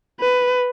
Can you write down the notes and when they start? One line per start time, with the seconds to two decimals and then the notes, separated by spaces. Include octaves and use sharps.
0.21 B4